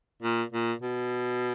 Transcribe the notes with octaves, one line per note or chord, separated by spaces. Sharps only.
A#2
A#2
B2